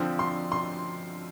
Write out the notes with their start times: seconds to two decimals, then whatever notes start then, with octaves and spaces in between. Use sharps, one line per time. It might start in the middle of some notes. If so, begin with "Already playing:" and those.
Already playing: D3 F3 C4
0.19 C6
0.52 C6